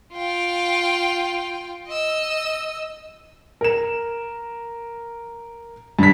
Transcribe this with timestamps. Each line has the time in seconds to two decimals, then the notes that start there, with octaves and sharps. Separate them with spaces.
0.13 F4 G5
1.88 D#5 E6
3.61 A#4 E7
5.99 G2 B6